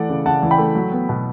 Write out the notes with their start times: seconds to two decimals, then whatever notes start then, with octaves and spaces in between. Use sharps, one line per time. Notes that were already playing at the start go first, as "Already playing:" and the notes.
Already playing: E3 A3 D5 F#5
0.09 C#3
0.26 C#3 F#5 A5
0.42 E3
0.51 G5 B5
0.58 A3
0.75 F#3
0.92 B3
1.09 B2